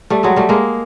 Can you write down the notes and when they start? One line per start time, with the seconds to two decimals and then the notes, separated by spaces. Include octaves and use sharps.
0.10 G3 A3
0.23 F#3 G#3
0.36 G3 A3
0.49 G#3 A#3